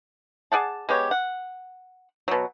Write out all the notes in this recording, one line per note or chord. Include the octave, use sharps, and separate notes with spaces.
G#4 D5 F#5 A5
G#3 B3 G4 C#5
F#5
B2 F#3